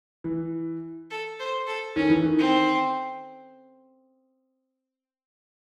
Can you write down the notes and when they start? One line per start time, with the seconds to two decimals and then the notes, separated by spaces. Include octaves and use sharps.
0.24 E3
1.11 A4
1.40 C5
1.67 A4
1.96 D#3 C#4
2.10 E3
2.24 D#3
2.39 C4